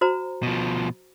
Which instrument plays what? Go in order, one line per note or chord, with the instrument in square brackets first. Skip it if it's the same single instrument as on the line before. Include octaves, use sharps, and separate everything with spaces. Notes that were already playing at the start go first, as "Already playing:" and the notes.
[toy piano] F#4 C5 A#5
[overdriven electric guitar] B2 F3